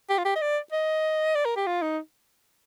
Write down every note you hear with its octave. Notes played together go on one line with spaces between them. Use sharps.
G4
F4
G4
D#5
D5
D#5
D5
A#4
G4
F4
D#4